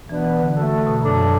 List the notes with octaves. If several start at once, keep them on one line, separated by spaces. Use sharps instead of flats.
B2 E3 B3 D4 B4
E3
D3
A3 F#4 A4
B2
F#2 F#3 D4 A4